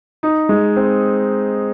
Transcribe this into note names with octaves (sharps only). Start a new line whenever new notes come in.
D#4
G#3
C4